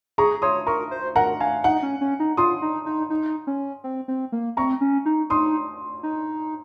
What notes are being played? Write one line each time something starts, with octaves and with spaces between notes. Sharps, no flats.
G#4 A#5 C#6
C#5 C6 D#6
A#4 A#5 C#6
C5
A#4 F#5 A#5
F5 G#5
D#4 F#5
C#4
C#4
D#4
F4 C6 D#6
D#4
D#4
D#4
C#4
C4
C4
A#3
C4 A#5 C#6
C#4
D#4
D#4 C6 D#6
D#4